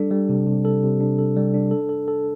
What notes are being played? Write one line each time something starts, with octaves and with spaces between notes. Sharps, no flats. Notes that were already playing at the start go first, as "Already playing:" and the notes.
Already playing: G3 D4 A4
G3
C3
C3
A4
C3
D4
A4
G3
D4
A4
A4
A4